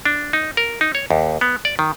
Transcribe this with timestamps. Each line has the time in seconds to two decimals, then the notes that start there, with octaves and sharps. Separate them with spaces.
0.05 D4
0.33 D#4
0.57 A#4
0.81 D#4
0.95 C#5
1.11 D#2
1.41 B3
1.65 D5
1.79 D#3